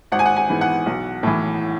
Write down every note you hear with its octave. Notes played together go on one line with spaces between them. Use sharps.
G#1 F#5
G#5
F#5
G#5
G#2 E3 B3
F#5
B1
A2 E3